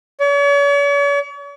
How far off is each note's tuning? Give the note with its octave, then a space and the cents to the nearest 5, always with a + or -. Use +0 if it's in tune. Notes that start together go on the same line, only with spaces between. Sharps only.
C#5 +45